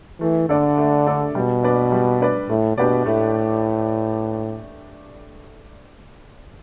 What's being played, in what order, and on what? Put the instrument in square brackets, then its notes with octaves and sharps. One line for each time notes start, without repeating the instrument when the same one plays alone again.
[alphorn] E3 [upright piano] A3
[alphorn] D3 [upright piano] D4 A4
[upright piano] A3
D4 A4
[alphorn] B2 [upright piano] G3
[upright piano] D4 B4 D5
G3
D4 B4 D5
[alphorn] A2 [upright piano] A3
[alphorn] B2 [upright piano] D4 G4 B4 D5
[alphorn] A2 [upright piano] A3